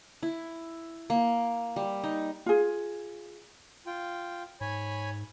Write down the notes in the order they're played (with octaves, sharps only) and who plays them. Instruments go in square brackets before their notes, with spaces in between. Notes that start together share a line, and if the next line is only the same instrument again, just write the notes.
[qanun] E4
A#3
G3
D#4
[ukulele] F4 G#4
[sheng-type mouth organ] F4 G5
[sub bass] G#2 [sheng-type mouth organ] C#5 G#5 B5